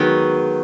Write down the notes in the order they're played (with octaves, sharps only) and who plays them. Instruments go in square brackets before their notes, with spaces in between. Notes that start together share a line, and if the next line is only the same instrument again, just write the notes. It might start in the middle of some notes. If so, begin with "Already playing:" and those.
Already playing: [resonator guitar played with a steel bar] D#3 F#3 B3 [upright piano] G#3